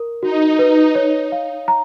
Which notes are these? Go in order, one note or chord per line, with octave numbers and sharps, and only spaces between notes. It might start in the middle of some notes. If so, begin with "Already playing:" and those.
Already playing: A#4
D#4 F#4
B4
C#5
F5
A#5